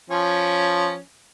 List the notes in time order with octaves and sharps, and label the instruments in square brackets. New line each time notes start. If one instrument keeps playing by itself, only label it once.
[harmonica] F3 C#4